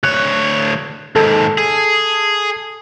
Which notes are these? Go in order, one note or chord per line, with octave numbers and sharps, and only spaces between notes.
D2 C#5 F#6
D#2 G#2 A4
G#4